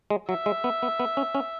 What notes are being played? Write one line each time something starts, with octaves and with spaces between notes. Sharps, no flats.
G#3
F#3 E5
G#3
B3
B3
B3
C#4
C#4